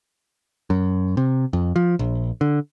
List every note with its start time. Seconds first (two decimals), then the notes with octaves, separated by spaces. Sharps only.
0.70 F#2
1.17 C3
1.53 F2
1.76 F3
1.99 A#1
2.41 D3